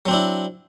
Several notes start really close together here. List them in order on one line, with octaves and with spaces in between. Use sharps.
F#3 C4 D4 E4